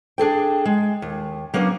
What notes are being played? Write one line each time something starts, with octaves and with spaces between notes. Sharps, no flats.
D4 G#4 A4 G5
G#3
D#2
F#3 A#3 B3 C#4 D4